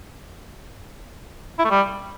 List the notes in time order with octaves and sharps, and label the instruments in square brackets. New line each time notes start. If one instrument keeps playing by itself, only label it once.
[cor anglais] E4
A3
G3